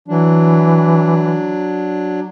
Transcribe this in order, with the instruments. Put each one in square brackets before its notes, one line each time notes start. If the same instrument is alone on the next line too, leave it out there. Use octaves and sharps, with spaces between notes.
[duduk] E3 [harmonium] F#3 D4